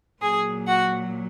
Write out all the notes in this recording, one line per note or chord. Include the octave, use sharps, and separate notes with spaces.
A#2 F#3 G#4 G#5
F#4 F#5